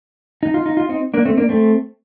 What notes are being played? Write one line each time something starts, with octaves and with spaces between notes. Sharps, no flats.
D#4
F4
D#4
F4
C4 D#4
A#3 D4
A3 C4
A#3 D4
A3 C4